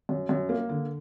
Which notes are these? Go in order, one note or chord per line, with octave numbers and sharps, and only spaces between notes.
F#2
F#2
A#3
D3